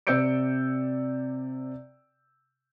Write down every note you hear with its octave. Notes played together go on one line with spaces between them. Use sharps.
C3 D5 E6 G6 C#7 D7